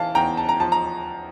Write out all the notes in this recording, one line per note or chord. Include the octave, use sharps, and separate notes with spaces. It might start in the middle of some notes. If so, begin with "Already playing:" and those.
Already playing: E3 F5 A5
E2 G5 A#5
A5
A#5
F3 A5
A#5